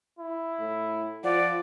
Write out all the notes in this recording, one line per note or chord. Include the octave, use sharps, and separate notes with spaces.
E4
A2
F3 D5 F#5